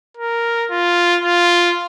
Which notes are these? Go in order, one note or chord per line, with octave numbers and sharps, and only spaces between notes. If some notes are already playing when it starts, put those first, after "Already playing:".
A#4
F4
F4